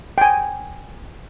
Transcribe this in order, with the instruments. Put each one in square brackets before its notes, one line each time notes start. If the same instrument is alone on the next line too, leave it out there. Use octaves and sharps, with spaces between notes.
[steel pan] G5 G#5